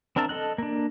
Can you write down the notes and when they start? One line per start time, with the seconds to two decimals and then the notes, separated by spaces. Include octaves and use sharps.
0.16 C4 D4 A#4 E5 A5
0.29 A4 D#5 F#6
0.58 A#3 D4